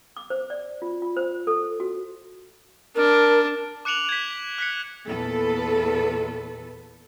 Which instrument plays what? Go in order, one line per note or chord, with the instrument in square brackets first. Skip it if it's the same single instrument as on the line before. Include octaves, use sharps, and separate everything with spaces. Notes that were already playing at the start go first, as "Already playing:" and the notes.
[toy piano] D6
C5
D5
F4
F4
C5
A4
F#4
[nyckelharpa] D4 [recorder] A#4
[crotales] D6 F#6 C#7 D7 F7 F#7
G#6 B6
F#6 B6 C#7
[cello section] E2 A#2 A4 B4